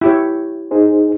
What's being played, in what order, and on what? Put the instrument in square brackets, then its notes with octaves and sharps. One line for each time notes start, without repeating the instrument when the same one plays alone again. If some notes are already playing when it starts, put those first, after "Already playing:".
[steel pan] E4 G4 C#5
[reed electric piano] D#4 G#4 C5